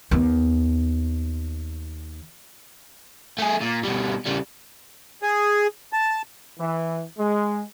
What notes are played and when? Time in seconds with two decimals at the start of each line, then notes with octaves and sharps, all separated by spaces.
0.11 D#2 B3
3.38 A3 G#4
3.61 A#2
3.83 B2 G3
4.26 C#3 G3
5.23 G#4
5.93 A5
6.59 E3
7.18 G#3